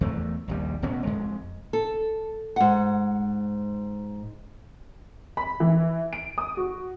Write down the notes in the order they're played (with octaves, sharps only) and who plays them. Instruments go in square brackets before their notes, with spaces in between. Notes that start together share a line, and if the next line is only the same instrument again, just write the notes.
[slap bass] E2 A3
A#1 D#2 G3
F1 B2 B3 C#4
F2 G#3
[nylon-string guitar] A4
G#2 F#5
[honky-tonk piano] B5
E3
D7
D#6
F#4